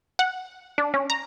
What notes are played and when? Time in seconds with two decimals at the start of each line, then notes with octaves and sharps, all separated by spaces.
0.19 F#5
0.78 D4
0.94 C#4
1.10 A#5